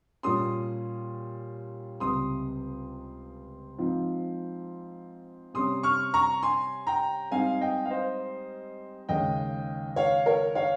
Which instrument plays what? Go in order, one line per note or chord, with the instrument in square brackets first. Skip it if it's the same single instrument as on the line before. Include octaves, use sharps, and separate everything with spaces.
[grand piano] A#2 G3 C#4 C6 D#6
C#2 C3 G3 C4 C6 D#6
G#2 F3 C4
C3 G3 C#4 C6 D#6
C#6 F6
A#5 C#6
G#5 C6
G5 A#5
G#2 G3 C4 F5 G#5
D#5 G5
F5
C5 D#5
D#2 C#3 G#3 C#4 D#5 G5
C#5 F5
A#4 C#5
C#5 F5